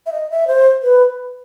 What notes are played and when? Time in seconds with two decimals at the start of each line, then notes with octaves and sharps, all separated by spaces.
0.06 E5
0.12 D#5
0.30 E5
0.48 C5
0.83 B4